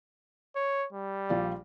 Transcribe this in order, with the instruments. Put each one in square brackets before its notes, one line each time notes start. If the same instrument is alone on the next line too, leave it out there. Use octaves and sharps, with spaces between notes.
[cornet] C#5
G3
[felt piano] A#1 F4 D5